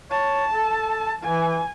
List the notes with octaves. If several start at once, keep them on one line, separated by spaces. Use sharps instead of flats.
C#5 A5
A4
E3 G#5